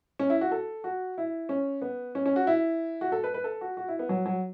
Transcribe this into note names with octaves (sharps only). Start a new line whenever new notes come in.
C#4
E4
F#4
A4
F#4
E4
C#4
B3
C#4
C#4
F#4
E4
F#4
A4
B4
B4
A4
F#4
F#4
E4
B3
F#3
F#3